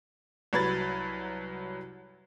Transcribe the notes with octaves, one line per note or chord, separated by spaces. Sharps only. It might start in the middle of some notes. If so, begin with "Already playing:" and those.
C2 F#3 B4 B5 G#6 A6